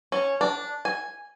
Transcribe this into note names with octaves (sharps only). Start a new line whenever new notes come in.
C#4
D4
G#5